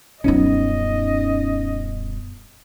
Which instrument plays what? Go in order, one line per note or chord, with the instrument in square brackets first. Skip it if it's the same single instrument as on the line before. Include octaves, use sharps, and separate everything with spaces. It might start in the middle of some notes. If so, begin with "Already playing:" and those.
[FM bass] D#1 [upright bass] F#2 B3 [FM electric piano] C#4 D#4 [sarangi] D#5